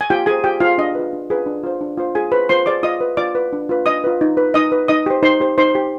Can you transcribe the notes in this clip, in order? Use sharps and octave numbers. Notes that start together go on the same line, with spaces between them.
G#5
F4 G4 G5
G#4 C5 G#5
F4 G4 G5
F4 G#4 C5 F5
D4 D#5
F4 G#4 B4
D4
F4 G#4 B4
D4
F4 C5
D4
F4 C5
F4 G#4 G#5
G#4 B4 C5 B5
F4 C5 C6
G#4 C5 D5 D6
F4 D#5 D#6
B4
F4 D5 D6
B4
D4
F4 B4
D4 D#5 D#6
F4 B4
D#4
B4
D#4 D#5 D#6
B4
D#4 D#5 D#6
G4 C5
D#4 C5 C6
G4 C5
D#4 C5 C6
G4 C5